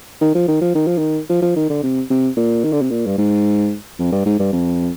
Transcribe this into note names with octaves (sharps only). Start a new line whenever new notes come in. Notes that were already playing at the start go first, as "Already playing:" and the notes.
D#3
F3
D#3
F3
D#3
F3
D#3
F3
F3
D#3
D3
C3
C3
A#2
D#3
D3
C3
A#2
G2
G#2
F2
G2
G#2
G2
F2